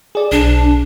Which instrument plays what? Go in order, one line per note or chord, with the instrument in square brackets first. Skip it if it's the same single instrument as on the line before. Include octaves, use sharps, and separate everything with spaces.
[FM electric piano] G#4 D5
[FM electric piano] B1 [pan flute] D4